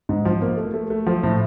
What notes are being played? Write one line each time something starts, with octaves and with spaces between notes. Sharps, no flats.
G#2
F3
A#3
A3
A3
A3
F3
A2